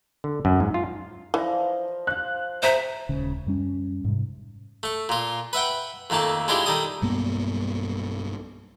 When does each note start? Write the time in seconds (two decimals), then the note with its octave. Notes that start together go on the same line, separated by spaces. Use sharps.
0.24 D3
0.45 F#2
0.60 G#2
0.74 F4
1.34 E3 F3 D5 A#5
2.07 C5 F5 F#6
2.63 G#4 B4 C5 E5 G5 A#5 B6
3.09 D#1 C#2 C#3
3.47 F#2 G3 C#4
4.05 G#2 C3
4.83 A3 C#6
5.09 A#2 F4
5.53 B4 E5 F#5 G5
6.10 F2 D#3 A3 A#3 A5
6.48 G#3 D4 E4 F4 G4
6.66 D#3 G3 A4 D#6
7.02 B1 G2 A#3 B3